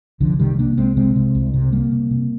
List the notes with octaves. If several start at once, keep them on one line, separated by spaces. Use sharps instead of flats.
C2 D3 F3
C3 D#3 G3
C3 A#3 D4
C2 G#3 C4
C3 G#3 C4
C3
C2
C3
C3 G3 A#3
C3
C3